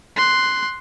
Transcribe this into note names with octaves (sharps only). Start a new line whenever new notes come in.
C6 F#6